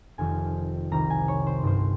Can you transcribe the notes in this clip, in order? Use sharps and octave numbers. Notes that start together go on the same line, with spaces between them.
F1 F2 D#3 G#5
C2 C3 D#3 A#5
G#5
C#5
C5
G1 G2 D#3 C5